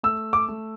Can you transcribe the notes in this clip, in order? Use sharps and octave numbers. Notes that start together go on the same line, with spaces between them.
A3 E6
D6
A3